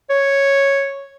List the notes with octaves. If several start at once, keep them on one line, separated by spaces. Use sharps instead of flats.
C#5